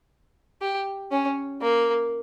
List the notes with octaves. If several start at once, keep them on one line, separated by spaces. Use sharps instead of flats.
G4
C#4
A#3